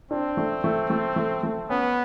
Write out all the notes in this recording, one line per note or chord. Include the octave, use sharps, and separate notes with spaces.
C4 D4
A3
A3
A3
A3
A3
B3 C#4